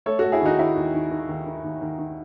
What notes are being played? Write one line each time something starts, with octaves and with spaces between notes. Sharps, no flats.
A3 A4 C#5
A3 F#4 A4
E4 G#4
D#2 D#4 F#4
D#3 E4
D#2
D#3
D#3
D#2
D#3
D#2
D#2
D#3